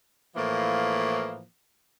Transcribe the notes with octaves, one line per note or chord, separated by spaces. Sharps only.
A2 E3 F3 A#3